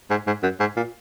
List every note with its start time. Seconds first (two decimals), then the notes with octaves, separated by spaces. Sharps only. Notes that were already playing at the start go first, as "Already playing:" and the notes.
0.10 G#2
0.27 G#2
0.43 F#2
0.60 G#2
0.77 A#2